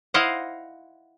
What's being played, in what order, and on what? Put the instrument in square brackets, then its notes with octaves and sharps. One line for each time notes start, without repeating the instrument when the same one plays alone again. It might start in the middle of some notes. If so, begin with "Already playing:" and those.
[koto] E4 C5 D#5 F5 F#5